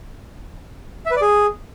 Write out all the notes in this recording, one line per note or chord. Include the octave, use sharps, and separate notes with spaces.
E5
B4
D5
G#4